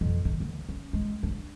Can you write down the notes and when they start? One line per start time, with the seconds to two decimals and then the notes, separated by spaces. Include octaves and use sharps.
0.01 F2 B2
0.25 D#3
0.40 D2 E3
0.69 C#4
0.93 G#3
1.23 D4